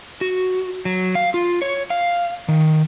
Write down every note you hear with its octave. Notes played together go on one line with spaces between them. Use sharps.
F#4
F#3
F5
F4
C#5
F5
D#3